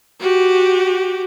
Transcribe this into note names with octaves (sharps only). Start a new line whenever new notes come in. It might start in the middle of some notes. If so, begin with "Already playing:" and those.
F#4 G4